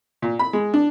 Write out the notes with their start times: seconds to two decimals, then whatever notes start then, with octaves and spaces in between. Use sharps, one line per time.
0.22 A#2
0.39 B5
0.53 G#3
0.74 D4